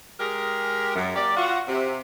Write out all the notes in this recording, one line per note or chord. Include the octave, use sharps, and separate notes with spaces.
G#3 G4 G#4 A#4
F#2
A#3 G4 D5
F4 F#4
C3